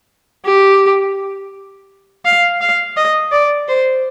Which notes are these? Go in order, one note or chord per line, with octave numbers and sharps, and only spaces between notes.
G4
F5
F5
D#5
D5
C5